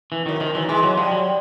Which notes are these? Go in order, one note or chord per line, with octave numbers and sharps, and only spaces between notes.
E3
D#3 F#3
D#3 F3
E3 F#3
E3 G#3
F#3 G#3
F3 G3
F#3